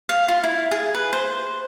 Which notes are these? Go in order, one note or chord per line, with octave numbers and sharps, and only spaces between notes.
F5
F4
E4
G#4
B4
C5